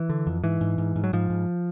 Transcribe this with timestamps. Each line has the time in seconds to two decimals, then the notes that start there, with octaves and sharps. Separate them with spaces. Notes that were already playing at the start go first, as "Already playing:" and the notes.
Already playing: E3
0.09 D3
0.27 F2
0.44 G#2 E3
0.61 G#2
0.78 G#2
0.96 G#2
1.04 F#3
1.13 G#2 F3
1.30 G#2